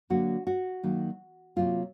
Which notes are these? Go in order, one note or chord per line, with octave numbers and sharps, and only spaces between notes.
D3 F#3 A#3 F#4
F#4
D#3 F#3 A#3
C3 D#3 F#3 A#3 F4